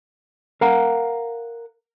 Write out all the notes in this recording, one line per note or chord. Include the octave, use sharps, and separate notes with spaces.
A#4 F5 F#5 A#5